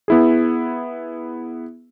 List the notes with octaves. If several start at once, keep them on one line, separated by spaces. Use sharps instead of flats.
B3 E4 G#4